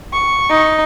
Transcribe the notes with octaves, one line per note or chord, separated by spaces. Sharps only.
C#6
D#4